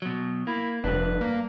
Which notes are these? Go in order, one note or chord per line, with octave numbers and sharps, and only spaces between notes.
B2 F#3
A#3 E4
F1 G2 D4 B4
A#3